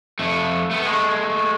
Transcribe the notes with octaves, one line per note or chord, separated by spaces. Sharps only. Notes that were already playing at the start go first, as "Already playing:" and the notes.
F2 A3
A3 B3
G#3 A3